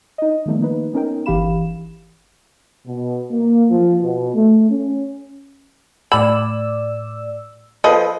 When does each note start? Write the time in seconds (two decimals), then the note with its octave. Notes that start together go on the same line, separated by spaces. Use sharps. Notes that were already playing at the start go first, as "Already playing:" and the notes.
0.18 D#4 D#5
0.46 D#3 F3 G3 A3 B3 D#4
0.59 D#3 A#3 D#4 B4
0.93 B3 C#4 D#4 A#4 G5
1.26 G1 E3 G4 F5 B5 E7
2.87 B2
3.32 A#3
3.70 F3
4.03 B2
4.35 A3
4.70 C#4
6.12 A2 D5 B5 E6
7.84 F3 A4 B4 D#5